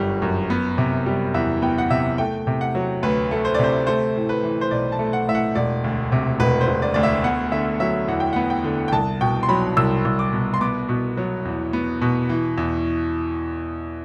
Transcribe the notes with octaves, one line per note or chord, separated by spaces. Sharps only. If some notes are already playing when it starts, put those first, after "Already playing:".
Already playing: G1 F#2 D3 G3
F#2
B3
C3
G3
E2 E5
B3 G5
F#5
C3 E5
A3 G5
C3
F#5
F#3
D2 B4
A3
C5
D5
C3 C5
A3 C5
A2
B4
E3
C5
B1 D5
A5
A3
F#5
A2 E5
F#5
E1 D5
D2
C3
E1 B4
C5
E1
D5
D2 D5
E5
B3 F#5
D3 E5
F#3 E5
E2 F#5
G5
B3 F#5
G5
D3
G5
C2 A5
B2 G5
C6
F#3 B5
C2 E6
C2
D6
B2
C6
B3 D6
B2
F#3
E2
B3
B2
E3
E2